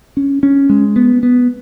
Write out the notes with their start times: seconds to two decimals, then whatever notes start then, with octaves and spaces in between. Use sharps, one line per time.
0.17 C#4
0.43 C#4
0.69 G#3
0.96 B3
1.23 B3